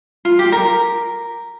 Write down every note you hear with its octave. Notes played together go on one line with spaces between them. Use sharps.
F4
G4
A#4